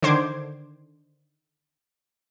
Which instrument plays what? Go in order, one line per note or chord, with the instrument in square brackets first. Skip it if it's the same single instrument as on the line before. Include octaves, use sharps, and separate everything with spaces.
[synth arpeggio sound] D3 D#3 C5 D6 G#6